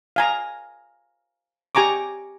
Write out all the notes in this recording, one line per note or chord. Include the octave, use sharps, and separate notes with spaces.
F5 G#5 A#5
G4 G#5 A#5 C#6 D6